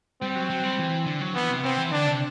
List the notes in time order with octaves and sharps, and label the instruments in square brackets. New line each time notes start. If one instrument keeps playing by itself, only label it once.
[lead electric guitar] G3 [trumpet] C4
[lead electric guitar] F#3
F#3
G3
E3
D3
F#3
[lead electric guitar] E3 [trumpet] B3
[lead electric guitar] C3
[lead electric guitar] C3 [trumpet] C4
[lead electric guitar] E3
[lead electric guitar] D3 [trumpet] D4
[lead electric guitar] C3